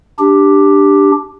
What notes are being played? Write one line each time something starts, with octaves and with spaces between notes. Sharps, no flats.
D4 G4